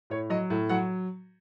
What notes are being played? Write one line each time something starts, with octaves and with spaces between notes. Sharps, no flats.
A2 C#5
F#3 D#5
A2
F#3 F#5